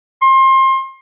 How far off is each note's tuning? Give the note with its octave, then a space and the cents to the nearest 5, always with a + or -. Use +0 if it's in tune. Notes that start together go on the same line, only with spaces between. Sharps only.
C6 +30